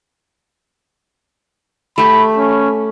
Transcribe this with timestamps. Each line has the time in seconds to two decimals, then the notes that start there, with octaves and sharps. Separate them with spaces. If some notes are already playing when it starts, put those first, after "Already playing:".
1.98 A3 G4 B5
2.37 C#4